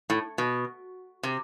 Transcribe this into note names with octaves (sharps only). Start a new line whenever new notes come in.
A2
B2
C3